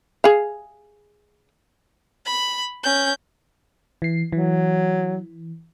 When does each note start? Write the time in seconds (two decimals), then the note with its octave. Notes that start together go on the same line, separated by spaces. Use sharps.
0.24 G#4 F5
2.25 B5
2.83 C#4 G6
4.02 E3 C7
4.33 E3 F#3